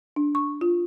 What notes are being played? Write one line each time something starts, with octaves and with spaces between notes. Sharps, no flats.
D4
C#6
F4